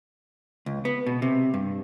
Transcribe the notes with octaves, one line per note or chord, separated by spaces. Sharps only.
C#2
B3
B2
C3
G2